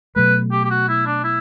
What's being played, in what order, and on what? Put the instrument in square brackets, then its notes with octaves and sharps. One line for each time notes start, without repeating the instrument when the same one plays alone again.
[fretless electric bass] B2 F#3 A3 [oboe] B4
[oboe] G4
G4
F#4
E4
D4
E4